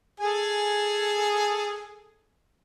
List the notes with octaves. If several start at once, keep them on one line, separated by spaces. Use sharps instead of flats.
G#4 A4 G#5